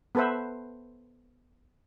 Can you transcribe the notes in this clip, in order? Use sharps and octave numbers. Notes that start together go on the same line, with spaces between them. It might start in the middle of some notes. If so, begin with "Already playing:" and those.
B3 A4 B4 C5 E5